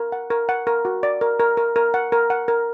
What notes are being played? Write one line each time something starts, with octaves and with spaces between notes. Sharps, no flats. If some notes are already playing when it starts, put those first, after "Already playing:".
Already playing: A#4
F#5
A#4
F#5
A#4
F#4
D5
A#4
A#4
A#4
A#4
F#5
A#4
F#5
A#4